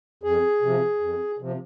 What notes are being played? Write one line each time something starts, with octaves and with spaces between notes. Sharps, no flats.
F2 G#4
C3 F3
F2
C3 F3